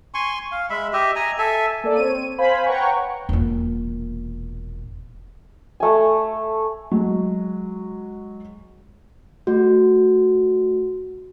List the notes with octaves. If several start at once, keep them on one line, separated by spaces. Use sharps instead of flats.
G#5 C6 C#6
F5
G#3 E5 B5
G4 D#5 E5
D#5 G#5 A#5
A4 E5 G#5
A#3 A4 D5
C4 C#5 D#7
C5 F5 G#5 B5
B4 C#5 F#5 G5 A#5 C#6
E1 A#2
A3 G#5
F#3 G#3
A3 F#4